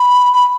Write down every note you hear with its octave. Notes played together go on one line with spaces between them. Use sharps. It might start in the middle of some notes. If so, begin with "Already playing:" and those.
Already playing: B5
B5